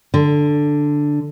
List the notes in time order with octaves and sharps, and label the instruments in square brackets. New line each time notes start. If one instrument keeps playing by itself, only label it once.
[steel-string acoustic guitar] D3